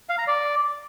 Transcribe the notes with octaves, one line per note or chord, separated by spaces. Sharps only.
F5
A#5
D5